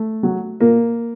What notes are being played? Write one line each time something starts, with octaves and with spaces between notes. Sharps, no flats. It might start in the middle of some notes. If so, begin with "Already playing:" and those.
Already playing: A3
F#3
A#2 A#3